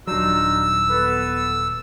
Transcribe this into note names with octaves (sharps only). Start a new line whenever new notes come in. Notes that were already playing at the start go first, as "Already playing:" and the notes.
D#1 F#3 D4 D#4 F4 E6
B3 A4 B4